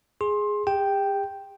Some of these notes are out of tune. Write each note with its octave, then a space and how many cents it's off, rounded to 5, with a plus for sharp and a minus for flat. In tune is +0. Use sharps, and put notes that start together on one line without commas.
G#4 +0 C6 +20
G4 +45 G5 +0